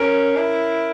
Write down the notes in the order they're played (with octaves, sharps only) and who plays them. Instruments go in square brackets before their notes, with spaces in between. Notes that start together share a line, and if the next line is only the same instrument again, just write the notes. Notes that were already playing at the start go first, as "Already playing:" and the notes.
Already playing: [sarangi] C#4 [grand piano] A#4
[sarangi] E4